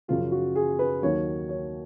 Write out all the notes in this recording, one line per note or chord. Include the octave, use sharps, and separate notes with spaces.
F#2 C#3 F3 F4
F#4
G#4
B4
D#2 D#3 F#3 C#5
C#5